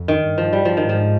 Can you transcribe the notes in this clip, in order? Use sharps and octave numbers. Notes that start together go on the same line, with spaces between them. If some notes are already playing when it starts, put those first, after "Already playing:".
Already playing: F2
D#3
G2
F3
G3
F3
G#2 D#3
F3